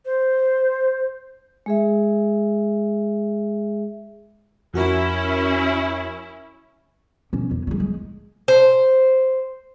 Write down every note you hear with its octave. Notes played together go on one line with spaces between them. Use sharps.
C5
G#3 G#4 E5
F2 C#4 E4 F#4 A#4
B2 C#4
E2
F#3 G#3
G#3
C5